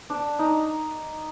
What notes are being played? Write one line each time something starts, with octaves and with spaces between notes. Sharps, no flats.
D4
D#4